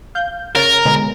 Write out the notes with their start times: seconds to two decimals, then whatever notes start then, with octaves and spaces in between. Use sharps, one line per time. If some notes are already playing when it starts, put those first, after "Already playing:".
0.15 F5 G6
0.56 C#3 A#4 C#5 A6
0.85 B2 D3 G#3